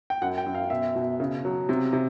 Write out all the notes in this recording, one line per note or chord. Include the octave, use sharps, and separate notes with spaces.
G5
F#2 F#5
G5
F#2
F5
B2 E5
B2
C#3
F#3
C3
C3